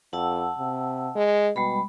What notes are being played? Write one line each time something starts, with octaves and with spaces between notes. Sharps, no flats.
F2 F#5 A5 E6
C3
G#3
B2 G3 G#3 B5